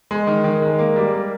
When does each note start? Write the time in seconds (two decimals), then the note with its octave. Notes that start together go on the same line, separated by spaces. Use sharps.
0.11 G#3
0.27 D#3
0.44 D#3
0.62 G#3
0.79 A#3
0.96 G3
1.14 A#3